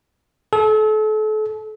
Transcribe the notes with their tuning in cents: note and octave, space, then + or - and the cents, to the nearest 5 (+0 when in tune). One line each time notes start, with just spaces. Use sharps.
A4 -35